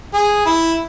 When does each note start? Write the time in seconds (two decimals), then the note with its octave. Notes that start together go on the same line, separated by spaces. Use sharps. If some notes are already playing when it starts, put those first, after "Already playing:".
0.14 G#4
0.46 E4